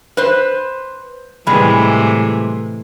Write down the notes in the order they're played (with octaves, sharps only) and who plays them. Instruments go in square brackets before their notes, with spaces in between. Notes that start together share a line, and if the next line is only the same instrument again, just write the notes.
[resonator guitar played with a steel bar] B4 C5
[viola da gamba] A2 C3 E3 [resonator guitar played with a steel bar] G3 G#3